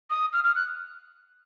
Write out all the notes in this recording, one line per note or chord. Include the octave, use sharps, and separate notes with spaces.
D#6
F6
F6
F#6